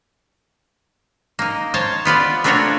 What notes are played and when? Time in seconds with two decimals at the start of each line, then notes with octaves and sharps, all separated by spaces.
1.39 A#3 D#4
1.74 C5 C#5 A5
2.05 B3 F4 B4 D5
2.44 A3 A#3 D4 F4 F#4 C#5